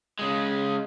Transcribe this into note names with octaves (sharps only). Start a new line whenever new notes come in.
C#3 G#3